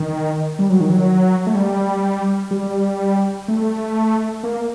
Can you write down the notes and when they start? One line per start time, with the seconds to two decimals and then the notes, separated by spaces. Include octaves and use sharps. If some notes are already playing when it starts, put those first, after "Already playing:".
Already playing: D#3
0.59 G3
0.70 F#3
0.81 D#3
0.90 F#3
1.47 A3
1.55 G3
2.51 G3
3.48 A3
4.43 A#3